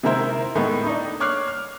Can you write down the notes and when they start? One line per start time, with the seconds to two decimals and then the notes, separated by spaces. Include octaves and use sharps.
0.03 C3 D#3 G#3 E4 A#4 C5
0.55 A2 D#3 G#3 B3
0.86 D4 D#4
1.20 C#5 D6 F6 F#6 C7
1.48 F6